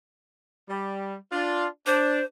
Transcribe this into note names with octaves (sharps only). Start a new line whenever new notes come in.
G3
D4 F4
D4 C5